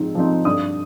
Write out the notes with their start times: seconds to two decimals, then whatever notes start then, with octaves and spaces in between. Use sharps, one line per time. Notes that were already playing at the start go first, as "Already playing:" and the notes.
Already playing: G#2 F3 C4 D#4
0.15 F3 C4 D#4
0.45 G2 D#6